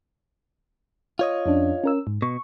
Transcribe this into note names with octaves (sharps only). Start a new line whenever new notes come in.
F4 C#5 D#5
F2 C#4 D4
C#4 A#4 E6
G#2
B2 C#6